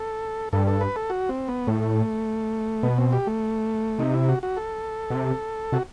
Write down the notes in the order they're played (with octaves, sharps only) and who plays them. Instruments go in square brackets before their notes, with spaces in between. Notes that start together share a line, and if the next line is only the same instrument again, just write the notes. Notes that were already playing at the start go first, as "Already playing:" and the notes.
Already playing: [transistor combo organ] A4
[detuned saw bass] G2 [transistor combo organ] A4
[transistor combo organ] A4
B4
A4
F#4
C4
B3
[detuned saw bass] A2 [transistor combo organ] A3
[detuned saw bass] B2 [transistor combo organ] B3
[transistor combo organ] C4
G4
A3
[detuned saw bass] C3 [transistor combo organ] D#4
[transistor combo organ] E4
F#4
F#4
A4
[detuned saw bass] B2
C3
[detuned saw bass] C3 [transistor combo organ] F#4